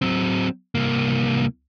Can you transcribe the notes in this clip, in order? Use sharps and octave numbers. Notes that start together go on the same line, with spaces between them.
F#3 C4
C2 A#3